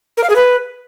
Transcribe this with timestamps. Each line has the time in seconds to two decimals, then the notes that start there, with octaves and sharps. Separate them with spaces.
0.17 A#4
0.23 F5
0.30 G#4
0.36 B4